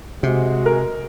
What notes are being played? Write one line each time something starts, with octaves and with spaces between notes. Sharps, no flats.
C3 G#3 F#4
A#4